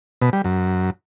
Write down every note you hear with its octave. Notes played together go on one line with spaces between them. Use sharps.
B2
G3
F#2